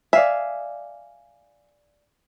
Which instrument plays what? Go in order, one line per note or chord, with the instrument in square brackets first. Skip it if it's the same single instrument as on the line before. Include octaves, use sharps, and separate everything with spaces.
[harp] D5 F5 G#5 [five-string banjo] E5